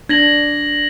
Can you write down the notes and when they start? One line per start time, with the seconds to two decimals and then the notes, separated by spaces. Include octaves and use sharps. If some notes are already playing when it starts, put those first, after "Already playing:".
0.09 D4 G#6 A#6 F#7